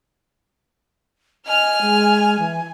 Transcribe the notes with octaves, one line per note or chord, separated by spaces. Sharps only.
D#5 G#5 F6
G#3
E3